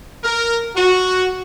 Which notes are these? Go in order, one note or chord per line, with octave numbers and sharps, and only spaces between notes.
A#4
F#4